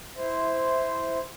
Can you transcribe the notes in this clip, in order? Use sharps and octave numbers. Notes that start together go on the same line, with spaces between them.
E4 C5